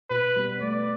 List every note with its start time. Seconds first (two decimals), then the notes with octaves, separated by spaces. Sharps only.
0.10 B2 B4
0.36 G3 B3
0.61 A3 D5